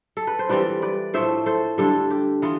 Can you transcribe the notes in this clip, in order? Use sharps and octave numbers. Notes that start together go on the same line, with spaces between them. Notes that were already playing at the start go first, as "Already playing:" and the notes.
A4
B4
C5
E3 G3 C4 F4 B4 D5
B4 D5
A2 F3 A3 C5 E5
A4 C5
D3 G3 D4 F4 A4
G4
E3 B3 F4